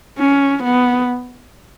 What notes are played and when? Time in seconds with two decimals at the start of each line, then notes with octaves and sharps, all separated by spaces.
0.19 C#4
0.64 B3